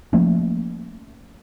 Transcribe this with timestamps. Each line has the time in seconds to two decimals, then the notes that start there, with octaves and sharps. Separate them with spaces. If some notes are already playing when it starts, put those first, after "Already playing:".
0.13 F3 A3 A#3 C#4